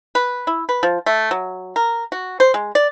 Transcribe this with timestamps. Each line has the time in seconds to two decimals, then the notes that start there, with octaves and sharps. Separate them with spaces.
0.15 B4
0.47 E4
0.69 B4
0.83 F3
1.06 A3
1.31 F#3
1.76 A#4
2.12 F#4
2.40 C5
2.54 G#3
2.75 D5